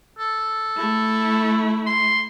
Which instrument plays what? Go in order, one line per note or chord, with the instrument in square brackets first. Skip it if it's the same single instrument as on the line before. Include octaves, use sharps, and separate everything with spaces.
[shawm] A4
[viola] A3 E4
[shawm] C6